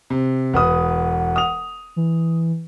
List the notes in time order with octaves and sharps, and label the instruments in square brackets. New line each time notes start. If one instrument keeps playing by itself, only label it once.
[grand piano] C3
[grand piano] E1 B4 D#6 [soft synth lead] F#5
[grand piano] D#6 F7
[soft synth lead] E3